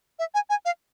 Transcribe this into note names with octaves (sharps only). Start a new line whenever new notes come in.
E5
G#5
G#5
F5